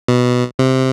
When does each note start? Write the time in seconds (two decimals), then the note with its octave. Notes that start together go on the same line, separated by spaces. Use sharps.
0.08 B2
0.59 C3